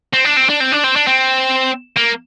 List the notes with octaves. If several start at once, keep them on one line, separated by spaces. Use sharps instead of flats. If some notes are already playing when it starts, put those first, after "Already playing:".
C4
D4
C4
D4
C4
D4
C4
D4
C4
A#3